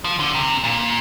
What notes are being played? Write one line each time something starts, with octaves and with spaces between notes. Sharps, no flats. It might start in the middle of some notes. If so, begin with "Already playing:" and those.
F3
D3
C3
A#2